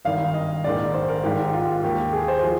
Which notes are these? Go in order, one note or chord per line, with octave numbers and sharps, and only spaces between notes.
G#1 G2 D#3 F5
D#5
A#1 G#2 D#3 D5
C5
A#4
G#1 G#2 D#3 G4
F4
D#2 D#3 G4
G#4
C5
F3 G#4